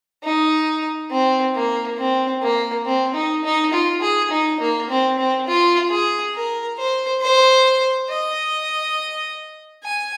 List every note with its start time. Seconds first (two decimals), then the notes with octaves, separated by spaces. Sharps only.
0.24 D#4
1.10 C4
1.55 A#3
1.98 C4
2.42 A#3
2.86 C4
3.14 D#4
3.44 D#4
3.73 F4
4.02 G#4
4.31 D#4
4.60 A#3
4.90 C4
5.19 C4
5.47 F4
5.90 G#4
6.35 A#4
6.78 C5
7.21 C5
8.10 D#5
9.84 G#5